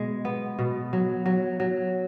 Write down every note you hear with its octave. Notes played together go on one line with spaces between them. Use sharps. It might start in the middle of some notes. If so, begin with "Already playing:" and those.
Already playing: B2 G#3
B3
B2
F#3
F#3
F#3